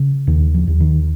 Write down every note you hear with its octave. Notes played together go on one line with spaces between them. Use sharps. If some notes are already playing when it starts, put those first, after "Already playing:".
Already playing: C#3
D#2 D#3
F3
D#2
D#3